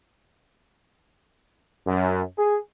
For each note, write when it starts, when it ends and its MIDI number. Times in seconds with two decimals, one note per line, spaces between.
1.87 2.22 42
2.37 2.58 68